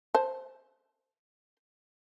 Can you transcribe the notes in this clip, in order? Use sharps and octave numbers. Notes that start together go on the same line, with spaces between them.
C5 A5